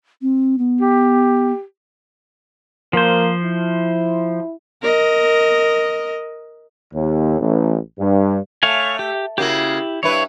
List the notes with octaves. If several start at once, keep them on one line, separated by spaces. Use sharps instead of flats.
C4
B3
G4
F3 A#3 C5
E4
A#4 D#5
D#2
A1
G2
A3 C#5 F5 G#5
G4
C#3 A#3 E4 F#4 G4
G2 E4 B4 C#5